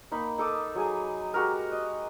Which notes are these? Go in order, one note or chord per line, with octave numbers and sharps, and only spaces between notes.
A#3 D#4 G5 B5
D#4 A4 D6 D#6
F#3 G#4 G#5
G#3 F#4 G4 A#4
D#5